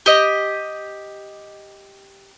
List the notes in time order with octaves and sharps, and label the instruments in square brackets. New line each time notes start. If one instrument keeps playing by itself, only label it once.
[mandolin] G4 D#5